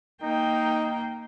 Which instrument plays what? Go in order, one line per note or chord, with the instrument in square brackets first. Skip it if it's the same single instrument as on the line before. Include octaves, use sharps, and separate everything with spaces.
[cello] A#3 G5 [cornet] D#4